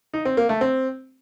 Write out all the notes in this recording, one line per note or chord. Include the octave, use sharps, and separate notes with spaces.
D#4
C4
A#3
A3
C4